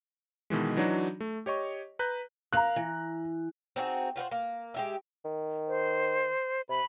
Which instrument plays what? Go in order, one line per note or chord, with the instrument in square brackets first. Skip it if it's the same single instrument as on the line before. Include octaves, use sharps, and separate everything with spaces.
[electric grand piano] B2 D#3 E3 G#3
E3 F#3 D4 D#4 F#4
A3
G4 C#5 D#5 C#6
B4 A#5 F#6 G6
[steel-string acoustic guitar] A#4 F5 [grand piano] A#5 F#6
[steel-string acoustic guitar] E3
[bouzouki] C4 D#4 F#4 G#4
F4 F#4 B4 C5
A#3
G#3 G4 E5
[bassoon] D#3
[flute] C5
[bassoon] C3 [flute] B5